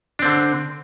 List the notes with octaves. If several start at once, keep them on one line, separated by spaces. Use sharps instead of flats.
D3 C4 D4